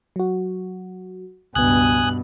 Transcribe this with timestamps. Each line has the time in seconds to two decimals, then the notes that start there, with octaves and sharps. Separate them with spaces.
0.16 F#3 F#4
1.55 C#2 G2 B2 B3 G#5 D#6 F#6